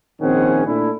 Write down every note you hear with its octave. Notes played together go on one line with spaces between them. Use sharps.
A#1 D#3 C4 C#4 G#4 F#5
A#2 A3 D4 E4